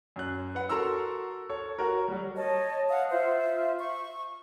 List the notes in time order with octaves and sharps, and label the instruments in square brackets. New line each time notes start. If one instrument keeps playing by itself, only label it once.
[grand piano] F#2 F#6
B4 F#5
F#4 A4 A#4 A#5 C6 E6
A4 C#5
F#4 A#4
F#3 G3
[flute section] C#5 D#5 A5
F5 F#5 D#6
F4 C5 E5
C#6